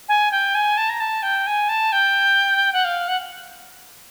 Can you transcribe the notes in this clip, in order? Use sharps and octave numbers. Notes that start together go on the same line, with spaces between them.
G#5
G5
G#5
A5
A#5
A5
G5
G#5
A5
G5
F#5
F5
F#5